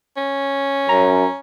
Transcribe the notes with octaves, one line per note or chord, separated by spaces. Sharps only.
C#4
F#2 A#5